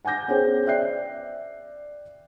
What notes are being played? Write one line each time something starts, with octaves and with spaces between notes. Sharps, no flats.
F#5 G#5 D6 G6 A#6
B3 C#4 G#4 C5 G5
D5 E5 G5 F#6 C7